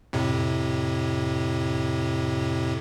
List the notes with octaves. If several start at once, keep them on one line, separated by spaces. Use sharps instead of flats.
F2 A2 C3